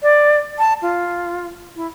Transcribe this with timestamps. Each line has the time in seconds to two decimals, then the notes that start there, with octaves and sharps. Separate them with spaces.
0.02 D5
0.58 A5
0.82 F4
1.76 E4